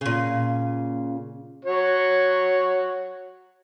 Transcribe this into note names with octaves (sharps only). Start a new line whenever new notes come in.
A#2 C#3
F#4 C#5